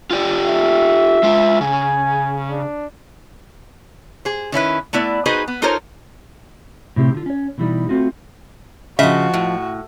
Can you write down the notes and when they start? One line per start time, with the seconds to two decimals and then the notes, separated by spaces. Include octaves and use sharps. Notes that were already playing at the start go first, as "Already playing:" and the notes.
0.11 F4 G4 D5
0.47 E5
1.23 G#3 F4
1.61 C#3 G#5
2.50 D4
4.25 G#4 C5
4.52 D#3 C#4 E4 B4
4.93 A3 B3 E4 D5
5.26 D#4 F#4 G#4 B4 C5 D#5
5.48 B3
5.62 D#4 F4 A4 A#4 C5 C#5
6.96 A2 C3 C4 G4
7.14 D3 F4
7.26 C#4 C#5
7.58 B2 E3 G3 D#4
7.89 A3 C4 F4 F#4
8.99 C#3 F3 F#4 D#5 E5
9.34 A2